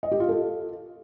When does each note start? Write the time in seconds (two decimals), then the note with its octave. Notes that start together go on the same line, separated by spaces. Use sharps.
0.03 D#5
0.12 G4
0.20 F4
0.29 A4